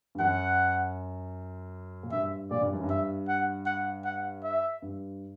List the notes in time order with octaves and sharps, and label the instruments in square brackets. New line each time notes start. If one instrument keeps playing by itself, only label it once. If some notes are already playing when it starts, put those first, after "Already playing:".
[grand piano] G2
[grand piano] F#2 [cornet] F#5
[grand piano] A#2
[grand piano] G2 [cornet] E5
[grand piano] A#2 [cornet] D5
[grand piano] G2
F#2
G2
[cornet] E5
F#5
F#5
F#5
E5
[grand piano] G2